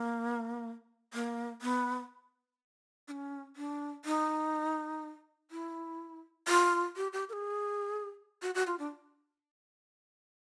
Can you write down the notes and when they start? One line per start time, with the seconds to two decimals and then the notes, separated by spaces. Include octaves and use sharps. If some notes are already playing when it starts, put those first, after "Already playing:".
Already playing: A#3
1.14 A#3
1.62 B3
3.08 D4
3.12 C#4
3.56 D4
4.05 D#4
5.51 E4
6.48 F4
6.96 G4
7.13 G4
7.29 A#4
7.33 G#4
8.42 F#4
8.55 F#4
8.67 F4
8.79 D4